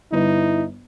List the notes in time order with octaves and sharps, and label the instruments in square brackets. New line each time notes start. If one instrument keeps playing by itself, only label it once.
[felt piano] G1 B4 [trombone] D#4 [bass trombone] E4